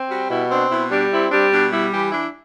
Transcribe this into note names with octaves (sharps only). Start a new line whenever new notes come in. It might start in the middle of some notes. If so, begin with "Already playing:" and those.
Already playing: C4
G3 F#4
B2 E4
C4 D4
B2 E4
G3 D4
C4 E4
G3 D4
B2 D4
G3 E4
E3 G4
D4 E4